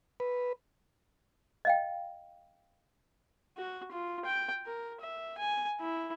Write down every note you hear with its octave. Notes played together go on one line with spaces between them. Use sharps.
B4
D#5 F5 G5
F#4
F4
G5
A#4
E5
G#5
E4